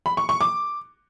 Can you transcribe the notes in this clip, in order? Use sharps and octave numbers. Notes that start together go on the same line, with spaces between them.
B5
C#6
C#6
D6